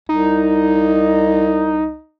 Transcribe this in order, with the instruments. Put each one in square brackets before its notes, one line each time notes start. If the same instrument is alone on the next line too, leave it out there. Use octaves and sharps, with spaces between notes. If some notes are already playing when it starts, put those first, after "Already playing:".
[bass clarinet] C2 [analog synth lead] D#4